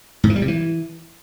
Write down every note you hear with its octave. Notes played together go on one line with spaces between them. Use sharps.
G#2
E3
G3
C3
E3